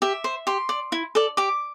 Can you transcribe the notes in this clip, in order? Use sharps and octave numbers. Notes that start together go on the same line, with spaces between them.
G4 E5
C5
G4 C6
D5
E4
A4 D5
G4 D6